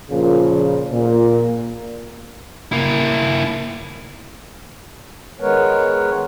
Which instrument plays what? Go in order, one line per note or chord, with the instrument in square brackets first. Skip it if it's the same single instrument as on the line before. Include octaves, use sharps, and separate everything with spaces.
[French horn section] A#2 C#3 F3
A#2
[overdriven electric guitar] A#3 E4
[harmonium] D#3 G#3 B3 A#4 B4 C#5